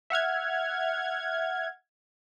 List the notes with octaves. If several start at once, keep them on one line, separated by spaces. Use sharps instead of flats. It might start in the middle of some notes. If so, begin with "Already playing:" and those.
E5 F#5 F6 G#6